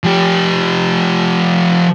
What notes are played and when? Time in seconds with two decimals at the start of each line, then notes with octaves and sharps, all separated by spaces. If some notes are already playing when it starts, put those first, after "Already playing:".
0.05 F3 G4